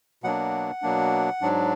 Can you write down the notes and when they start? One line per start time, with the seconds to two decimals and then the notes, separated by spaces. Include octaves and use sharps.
0.24 B2 F#3 A#3 D4 F#5
0.82 B2 F#3 A#3 D4
1.41 G#2 F#3 D4